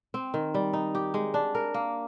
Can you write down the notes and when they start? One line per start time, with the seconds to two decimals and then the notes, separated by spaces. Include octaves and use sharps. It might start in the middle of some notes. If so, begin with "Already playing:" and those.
0.14 C4
0.34 D#3
0.54 G3
0.73 D#4
0.95 G4
1.14 G#3
1.34 D4
1.55 A#4
1.74 A#3